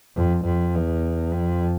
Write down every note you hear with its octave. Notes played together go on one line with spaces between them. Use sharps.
F2
F2
E2
F2